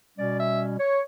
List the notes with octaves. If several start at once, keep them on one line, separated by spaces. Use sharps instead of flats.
B2 G3 C#4 D5
E5
C#5